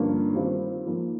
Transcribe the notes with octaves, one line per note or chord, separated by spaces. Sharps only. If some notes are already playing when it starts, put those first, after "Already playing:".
Already playing: G2 D3 F3 A#3 C#4
D#3 G3 C4 F4
G#2 F3 A#3